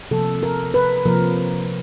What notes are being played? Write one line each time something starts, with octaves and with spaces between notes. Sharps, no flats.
C3 F3 A#3 A4
A#4
B4
C3 F3 A#3 A#4